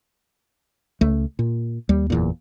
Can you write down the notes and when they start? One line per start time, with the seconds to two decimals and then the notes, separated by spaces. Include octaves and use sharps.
1.01 C#2 A3
1.39 A#2
1.89 D#2 G3
2.10 F#1 E2 A#2